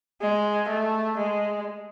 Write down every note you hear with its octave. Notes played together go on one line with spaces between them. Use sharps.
G#3
A3
G#3